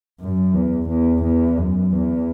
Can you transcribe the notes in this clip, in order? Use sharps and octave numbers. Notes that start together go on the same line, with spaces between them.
F#2
E2
E2
E2
F#2
E2